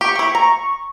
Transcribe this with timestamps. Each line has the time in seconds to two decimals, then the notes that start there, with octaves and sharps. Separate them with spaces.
0.01 G4 C#6
0.16 E4 G4
0.35 A#5